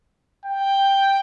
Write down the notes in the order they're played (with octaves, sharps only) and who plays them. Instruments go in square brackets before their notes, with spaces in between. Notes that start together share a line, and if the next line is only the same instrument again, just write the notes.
[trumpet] G5